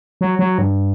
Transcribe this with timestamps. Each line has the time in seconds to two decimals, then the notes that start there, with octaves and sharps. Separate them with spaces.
0.21 F#3
0.39 F#3
0.58 G2